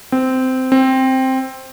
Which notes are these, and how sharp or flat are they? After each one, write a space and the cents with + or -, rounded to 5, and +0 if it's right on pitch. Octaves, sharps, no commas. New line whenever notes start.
C4 -15
C4 +5